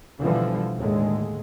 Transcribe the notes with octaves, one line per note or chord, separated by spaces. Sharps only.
B2 D3 E3 F3 G3
D#2 A2 D3 G#3